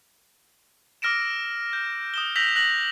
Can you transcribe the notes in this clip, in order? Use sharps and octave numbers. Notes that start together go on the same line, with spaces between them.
D6 E6 F6 A#6 D7 E7
G6
D#6 E7 G7
E6 G6 A#6 B6 F7 F#7
F#6 A#6 F#7